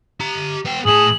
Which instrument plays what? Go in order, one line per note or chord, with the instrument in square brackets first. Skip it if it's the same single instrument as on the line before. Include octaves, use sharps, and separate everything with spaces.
[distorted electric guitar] G4 A#5
B3 G5
[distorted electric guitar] A2 A5 [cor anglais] G#4 [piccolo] F#7